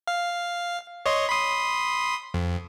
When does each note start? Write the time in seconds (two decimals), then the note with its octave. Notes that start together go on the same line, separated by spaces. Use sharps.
0.07 F5
1.06 C#5 D#5 C6
1.29 B5 C6 D#6
2.34 F2